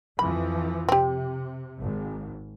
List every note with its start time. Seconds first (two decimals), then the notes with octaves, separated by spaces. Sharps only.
0.19 F2 E3 F3 B5
0.89 C3 C4 G4
1.79 G#1